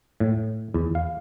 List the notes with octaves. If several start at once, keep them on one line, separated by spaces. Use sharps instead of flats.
A2
E2
F5